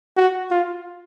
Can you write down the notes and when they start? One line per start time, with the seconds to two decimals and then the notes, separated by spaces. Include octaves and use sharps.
0.17 F#4
0.51 F4